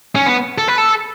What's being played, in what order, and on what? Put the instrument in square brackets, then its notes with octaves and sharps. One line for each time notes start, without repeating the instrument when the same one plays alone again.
[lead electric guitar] C#4
B3
A4
B4
A4